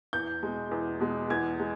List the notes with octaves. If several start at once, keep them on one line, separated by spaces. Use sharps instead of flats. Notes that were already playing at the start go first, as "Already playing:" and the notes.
E2 G6
B2 G#3
E2
B2 G#3
E2 G#6
G#3